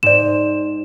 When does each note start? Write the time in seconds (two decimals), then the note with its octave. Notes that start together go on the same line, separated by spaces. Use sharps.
0.03 G#2 D5 E7